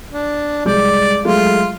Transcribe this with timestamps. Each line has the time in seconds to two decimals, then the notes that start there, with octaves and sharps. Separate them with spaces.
0.12 D4
0.65 C2 G#3 D5 G6
1.25 F#3 G#3 A3 F4